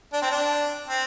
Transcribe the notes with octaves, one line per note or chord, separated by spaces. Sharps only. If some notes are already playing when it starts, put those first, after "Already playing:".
D4
C4
D4
C4